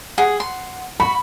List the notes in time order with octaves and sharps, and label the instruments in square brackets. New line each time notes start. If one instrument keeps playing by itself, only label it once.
[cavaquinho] G#4 [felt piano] F#5
[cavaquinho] C6
[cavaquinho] F#4 [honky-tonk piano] B5